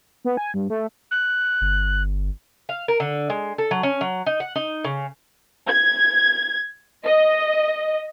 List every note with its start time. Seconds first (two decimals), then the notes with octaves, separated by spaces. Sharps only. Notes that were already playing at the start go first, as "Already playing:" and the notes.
0.25 B3
0.37 G#5
0.54 G2
0.70 A3
1.11 F#6
1.61 G1
2.69 F5
2.88 A#4
3.00 D3
3.30 G#3
3.58 A4
3.71 F#3
3.83 C#4
4.01 F#3
4.26 D#4
4.40 F#5
4.56 D#4
4.84 C#3
5.68 G#6
7.05 D#5